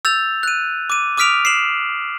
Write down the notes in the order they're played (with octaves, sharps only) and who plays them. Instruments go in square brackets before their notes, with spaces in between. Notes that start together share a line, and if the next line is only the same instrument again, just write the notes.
[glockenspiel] E6 G6 A6 F7
F#6 D#7
D6 D#7
D6 D#6 F6 B6 D7 F7
C7 E7 F#7